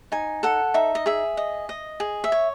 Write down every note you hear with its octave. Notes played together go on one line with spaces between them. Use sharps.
D#4 G#5
A4 F#5
D#4 E5
D#5
G#4 E5
D#5
D#5
G#4
E5
C#5